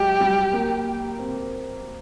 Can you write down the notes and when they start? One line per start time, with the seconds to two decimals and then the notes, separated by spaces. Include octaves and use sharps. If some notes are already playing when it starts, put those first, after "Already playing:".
Already playing: F#3 G#3 G4
0.20 G3
0.53 A#3
1.19 C4